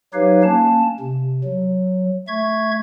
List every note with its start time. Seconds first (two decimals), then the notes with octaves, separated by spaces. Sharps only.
0.14 F#3 D#4 G4 B4 C#5 F5
0.43 A#3 C#4 A5
1.00 C3
1.44 F#3
2.28 A3 E5 C#6 G#6